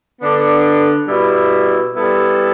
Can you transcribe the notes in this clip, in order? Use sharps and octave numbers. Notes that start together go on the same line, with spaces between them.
D3 B3 D4 A4 D5
B2 G3 E4
G3 B3 E4 A4